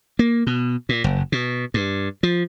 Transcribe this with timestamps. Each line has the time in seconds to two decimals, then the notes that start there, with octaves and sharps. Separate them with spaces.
0.19 A#3
0.47 B2
0.89 A#2
1.04 F#1
1.32 B2
1.74 G2
2.23 F3